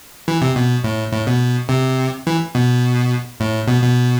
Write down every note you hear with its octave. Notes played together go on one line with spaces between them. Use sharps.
E3
C3
B2
A2
A2
B2
C3
E3
B2
A2
B2
B2